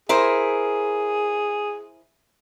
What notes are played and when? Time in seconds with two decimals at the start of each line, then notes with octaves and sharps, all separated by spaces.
0.09 E4 G#4 A#4 C5